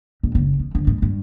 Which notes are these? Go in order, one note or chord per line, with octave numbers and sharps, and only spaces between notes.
A#1
F#1
F2
G1
G#2
G2